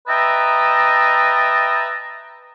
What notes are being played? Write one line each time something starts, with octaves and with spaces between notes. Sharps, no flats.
B4 D#5 E5 G5 A5 A#5